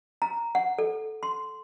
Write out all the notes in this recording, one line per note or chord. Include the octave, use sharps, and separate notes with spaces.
A#5
F#5
A4
C6